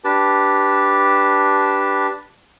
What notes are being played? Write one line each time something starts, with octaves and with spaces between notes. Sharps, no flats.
D4 G4 B4 A5